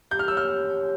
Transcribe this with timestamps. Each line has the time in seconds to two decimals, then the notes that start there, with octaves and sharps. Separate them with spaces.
0.11 G4 G6
0.19 F6
0.28 C#5 E6
0.37 F6
0.50 G4
0.69 C#5